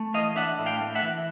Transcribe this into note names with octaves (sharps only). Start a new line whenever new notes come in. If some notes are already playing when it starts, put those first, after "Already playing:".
Already playing: A3
E3 D#5 F5
D4 E5 F#5
A2
F5 G5
A3
E5 F#5
E3